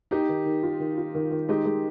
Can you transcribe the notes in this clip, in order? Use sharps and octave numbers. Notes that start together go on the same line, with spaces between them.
A#3 D#4 G4
D#3
D#3
F4
D#3
F4
D#3
D#3
G#3 D#4 G4
G#3